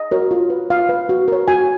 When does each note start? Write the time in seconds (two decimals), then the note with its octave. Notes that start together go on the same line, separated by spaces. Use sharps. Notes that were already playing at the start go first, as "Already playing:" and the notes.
Already playing: D#5
0.11 F#4 A#4 C#5
0.31 F4
0.50 B4
0.70 F4 F5
0.89 B4
1.09 F#4
1.28 A#4 C#5
1.48 F#4 G#5